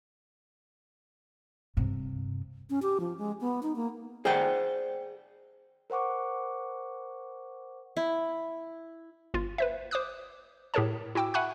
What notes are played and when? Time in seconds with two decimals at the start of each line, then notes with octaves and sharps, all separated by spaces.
1.77 G2 C3
2.70 C#4
2.82 G4
3.00 F3
3.18 G#3
3.41 B3
3.63 D#4
3.76 A#3
4.25 G#4 C5 D5 F#5 G5
5.90 A#4 C5 F#5 C#6 D6
7.97 E4
9.34 G1 F4
9.58 B4 C5 E5
9.91 C5 D6 D#6 F#6
10.74 A2 G4 G#4 A#4 C#5 A5
11.15 E4 F#4 G5 D6 E6
11.34 E5 F#5 G#5 B5 C#6 F#6